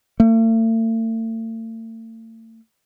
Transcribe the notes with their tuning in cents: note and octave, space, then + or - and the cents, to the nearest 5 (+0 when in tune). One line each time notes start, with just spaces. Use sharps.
A3 +40